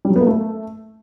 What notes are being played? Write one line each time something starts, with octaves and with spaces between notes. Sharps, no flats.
G3
F#3
B3
A#3
A3